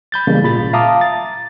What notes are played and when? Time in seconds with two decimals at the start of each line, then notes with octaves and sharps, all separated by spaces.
0.12 B5 G6 A6
0.27 C#3 E3 G3 G#3 A#3
0.42 G#1 A#2 B5 A6
0.73 E5 F5 A5 A#5 D6 D#6
1.01 A6